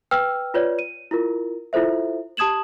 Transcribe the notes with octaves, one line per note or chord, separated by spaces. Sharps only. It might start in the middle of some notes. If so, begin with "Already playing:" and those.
B4 G5 E6 F6
F4 B4 C#5 D5
D#7
E4 F4 A#4
E4 F4 A4 C5 E5
G4 A5 D#6 G#6 E7 F#7